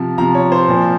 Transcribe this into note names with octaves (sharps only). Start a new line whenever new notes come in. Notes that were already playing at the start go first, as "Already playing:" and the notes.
Already playing: C3 F3
C3 F3 A#5
C#5
C5
A#2 F3